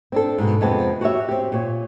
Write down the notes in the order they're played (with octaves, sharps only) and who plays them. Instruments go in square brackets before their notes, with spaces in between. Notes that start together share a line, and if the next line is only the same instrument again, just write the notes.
[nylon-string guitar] C4 D4 A4
G#2 B2
F2 C3 G#3 B3 C4 A5
F#4 G4 C#5 E5
C4 G4
A#2 C#5